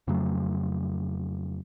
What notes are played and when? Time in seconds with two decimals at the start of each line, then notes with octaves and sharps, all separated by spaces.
0.07 F2 C#3 F#3 A3